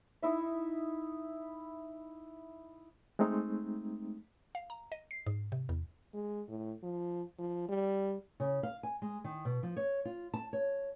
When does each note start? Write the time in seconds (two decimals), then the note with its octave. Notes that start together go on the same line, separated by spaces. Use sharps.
0.22 D#4 E4 E5
3.19 G#3 A3 C4 D#4
4.55 F5
4.70 A#5
4.92 D#5
5.11 C7
5.27 G#2
5.52 C3
5.69 E2
6.14 G#3
6.48 A2
6.83 F3
7.38 F3
7.68 G3
8.40 C#3
8.63 F5
8.83 G#5
9.02 G#3
9.24 D#3
9.45 B2
9.63 F3
9.77 C#5
10.05 F4
10.34 A5
10.53 C#5